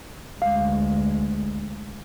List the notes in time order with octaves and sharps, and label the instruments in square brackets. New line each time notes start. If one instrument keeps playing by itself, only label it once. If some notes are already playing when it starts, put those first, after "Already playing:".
[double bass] D2 G#3 [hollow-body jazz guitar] F5